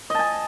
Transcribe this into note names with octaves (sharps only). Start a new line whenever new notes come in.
D#5 G#5 A5